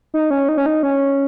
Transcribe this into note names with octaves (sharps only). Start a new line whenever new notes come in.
D#4
C#4
D#4
C#4
D#4
C#4